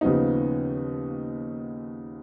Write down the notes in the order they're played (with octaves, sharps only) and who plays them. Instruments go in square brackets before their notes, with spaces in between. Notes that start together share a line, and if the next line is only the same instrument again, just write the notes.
[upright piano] D#2 C#3 F3 B3 D#4